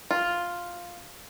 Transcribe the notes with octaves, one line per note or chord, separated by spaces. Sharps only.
F4